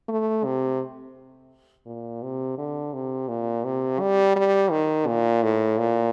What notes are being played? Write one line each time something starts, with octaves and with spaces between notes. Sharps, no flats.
A3
C3
A#2
C3
D3
C3
A#2
C3
G3
G3
D#3
A#2
A2
A#2